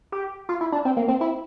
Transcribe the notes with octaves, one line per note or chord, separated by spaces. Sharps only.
G4
F4
E4
D4
C4
A#3
C4
E4